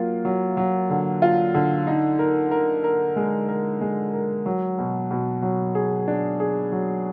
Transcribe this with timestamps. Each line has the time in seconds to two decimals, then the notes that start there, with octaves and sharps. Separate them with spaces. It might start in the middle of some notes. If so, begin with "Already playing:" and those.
Already playing: F#3 A#3 F4
0.25 F#3
0.57 F#3
0.90 D3
1.22 F4
1.54 D3
1.87 D#4
2.19 A#4
2.51 A#4
2.84 A#4
3.16 G#3
3.49 A#4
3.81 G#3
4.14 A#4
4.46 F#3
4.78 B2
5.11 B2
5.42 F#3
5.75 G#4
6.08 D4
6.40 G#4
6.72 F#3